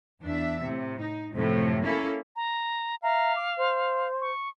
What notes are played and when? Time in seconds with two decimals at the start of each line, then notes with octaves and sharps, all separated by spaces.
0.23 E2 D4 E5
0.64 A2 C3
1.01 D#4
1.36 F#2 A2 C3 F3
1.82 A#3 C#4 E4 A4
2.36 A#5
3.02 E5 F5 A#5
3.35 D6
3.56 C5
4.21 C#6